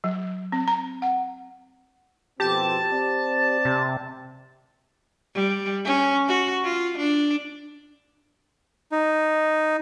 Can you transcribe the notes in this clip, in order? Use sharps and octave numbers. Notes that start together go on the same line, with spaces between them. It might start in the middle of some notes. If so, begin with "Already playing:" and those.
F#3
C4
A#5
F#5
F2 B2 C4 G4 A5
C4 D5
C3
G3
C#4
F#4
F4
D4
D#4